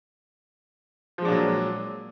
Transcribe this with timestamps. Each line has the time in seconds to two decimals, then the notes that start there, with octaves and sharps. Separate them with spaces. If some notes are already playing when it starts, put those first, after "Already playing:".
1.18 F3
1.22 G#3
1.25 D4
1.28 A#2
1.32 F#3